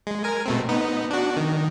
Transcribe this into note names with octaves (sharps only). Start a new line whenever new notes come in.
G#3
A#4 G#5
B2 A3 C4
B3 D#4
D4 F#4
D#3